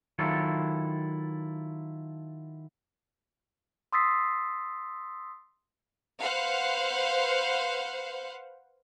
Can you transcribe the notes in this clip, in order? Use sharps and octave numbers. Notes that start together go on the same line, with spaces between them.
D#3 F#3 E4 F4 A4
C6 D#6 E6 A6 B6 C7
B4 C5 F5 F#5